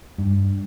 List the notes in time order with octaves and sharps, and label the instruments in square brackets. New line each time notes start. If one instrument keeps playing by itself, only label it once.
[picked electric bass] G2